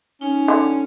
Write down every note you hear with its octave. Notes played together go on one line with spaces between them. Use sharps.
C#4 D#4
D3